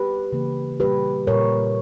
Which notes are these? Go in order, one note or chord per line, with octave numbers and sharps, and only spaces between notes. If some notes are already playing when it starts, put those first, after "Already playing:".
Already playing: G4 B4
C#3 E3 A#3
A#2 G3 A#3 G4 B4
A#2 G3 A#3 A#4 C#5